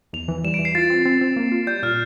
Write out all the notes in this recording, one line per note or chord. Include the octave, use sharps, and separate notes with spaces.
E2 F7
E3
G3 E7
D7
E3
C7
F4 A6
C4
C4 A6
C4
A#3
F4
G3 G6
A#2 F6